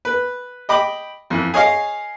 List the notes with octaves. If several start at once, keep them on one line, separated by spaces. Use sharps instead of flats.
B4
D#5 G5 B5 D6
F2 E3
G#4 C#5 D#5 F5